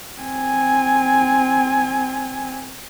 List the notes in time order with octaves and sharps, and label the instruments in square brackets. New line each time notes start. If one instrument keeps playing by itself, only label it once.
[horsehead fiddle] C4 G#5